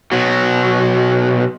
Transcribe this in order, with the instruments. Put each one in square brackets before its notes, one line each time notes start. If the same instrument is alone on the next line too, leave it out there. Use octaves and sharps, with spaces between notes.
[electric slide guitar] B2 F#3